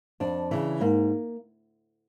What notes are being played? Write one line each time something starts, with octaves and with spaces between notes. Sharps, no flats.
F2 D4
C#3 E3
G#2 A#3